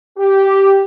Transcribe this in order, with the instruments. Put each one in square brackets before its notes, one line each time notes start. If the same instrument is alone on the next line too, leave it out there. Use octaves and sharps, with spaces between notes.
[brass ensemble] G4